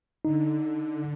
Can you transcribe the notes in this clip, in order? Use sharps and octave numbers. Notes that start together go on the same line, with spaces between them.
D3 D#4